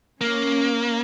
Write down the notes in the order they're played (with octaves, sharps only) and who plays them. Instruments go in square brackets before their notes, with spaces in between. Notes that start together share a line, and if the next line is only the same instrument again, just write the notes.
[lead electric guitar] A#3 [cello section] C#4